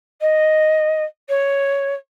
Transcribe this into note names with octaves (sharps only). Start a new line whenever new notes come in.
D#5
C#5